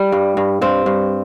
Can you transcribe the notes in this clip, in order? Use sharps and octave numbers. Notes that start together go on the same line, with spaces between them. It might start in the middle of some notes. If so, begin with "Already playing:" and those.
Already playing: G3
G2
G2
G2 C4
G2